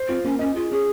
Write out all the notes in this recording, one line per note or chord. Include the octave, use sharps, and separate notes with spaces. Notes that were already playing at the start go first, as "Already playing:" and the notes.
Already playing: C5
C4 F4
A#3 C#4
C#4 D#5
F4 G#4
C#4 G#4